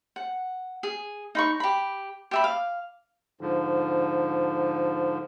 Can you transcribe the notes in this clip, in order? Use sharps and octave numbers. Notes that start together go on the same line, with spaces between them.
F#5
G#4
D#4 B5 C#6
G4 B5
G4 E5 B5
F5
G#2 D3 F3